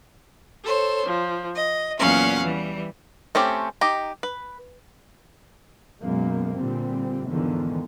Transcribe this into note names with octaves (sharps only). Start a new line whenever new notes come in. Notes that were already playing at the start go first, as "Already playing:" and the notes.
A4 C5 C#5
F3
D#5
E2 A#2 F#3 C#4 F5 F#5
E3 G3
A3 C4 C#4 G4
D#4 G4 A#5
B4
F#2 B2 G#3 A#3 B3
A#2 D3 G3 C4
E2 G#2 D3 D#3 F3